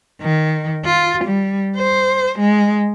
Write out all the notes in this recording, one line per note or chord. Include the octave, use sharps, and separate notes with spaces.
D#3
F4
G3
C5
G#3